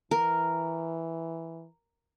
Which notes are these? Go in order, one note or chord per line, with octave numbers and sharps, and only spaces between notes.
E3 A#4